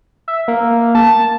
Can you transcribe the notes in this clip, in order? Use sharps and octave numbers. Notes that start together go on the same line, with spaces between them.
E5
A#3
A5